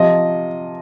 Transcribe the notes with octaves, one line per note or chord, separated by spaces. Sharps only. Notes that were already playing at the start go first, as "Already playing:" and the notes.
Already playing: C3 F3 D#5